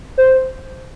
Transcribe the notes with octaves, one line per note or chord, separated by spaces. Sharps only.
C5